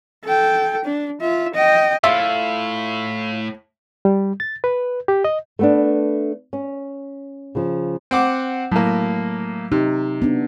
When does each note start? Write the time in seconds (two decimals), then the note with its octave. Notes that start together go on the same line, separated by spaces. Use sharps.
0.25 A4 G5
0.85 D4
1.21 F4 E5
1.55 D#5 G5
2.04 A2 F4 E5
4.05 G3
4.40 A6
4.64 B4
5.08 G4
5.24 D#5
5.59 A3 B3 D4
6.53 C#4
7.55 C#3 F3
8.11 C4 F#5 D6
8.72 A2 F#3 A#3
9.72 C3 D#4
10.22 B3 D4